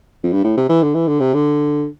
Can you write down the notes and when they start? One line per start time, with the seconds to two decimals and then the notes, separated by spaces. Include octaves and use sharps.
0.23 F2
0.32 G2
0.44 A2
0.57 C3
0.69 E3
0.82 D3
0.94 E3
1.07 D3
1.20 C3
1.33 D3